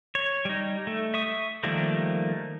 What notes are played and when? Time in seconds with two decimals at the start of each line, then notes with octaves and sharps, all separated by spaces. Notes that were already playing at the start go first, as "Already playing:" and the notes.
0.15 C#5
0.45 G3 D#4
0.87 A3
1.14 E5 C#6 D#6
1.63 D#3 F3 G3 A3 A#3